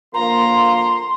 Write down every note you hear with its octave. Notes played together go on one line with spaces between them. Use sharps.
D3 F3 A#3 A#5 C6